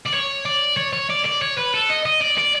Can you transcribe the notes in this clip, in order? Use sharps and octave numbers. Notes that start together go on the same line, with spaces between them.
D5
C#5
D5
C#5
C#5
D5
D5
C#5
B4
A4
D#5
D#5
D5
D5